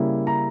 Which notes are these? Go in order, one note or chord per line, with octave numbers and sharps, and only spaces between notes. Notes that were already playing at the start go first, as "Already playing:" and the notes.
Already playing: C#3 G3 A#3 E4
A#5